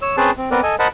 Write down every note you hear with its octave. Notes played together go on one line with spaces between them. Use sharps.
C#5 E6
C4 C#4 G#4 B4 C5 A5
C4
B3 C4 A#4 B4 D5
A4 D#5 G#5
A#4 C5 D#5 F#5 A5 B5